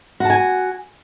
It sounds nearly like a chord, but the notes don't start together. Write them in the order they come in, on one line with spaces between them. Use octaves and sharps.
F#4 A5 G#5